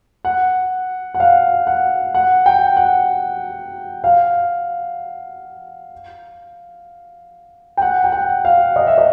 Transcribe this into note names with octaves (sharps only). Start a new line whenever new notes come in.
F#5
F#5
F5
F#5
F#5
G5
F#5
F5
G5
F#5
G5
F#5
F5
D#5
E5
D#5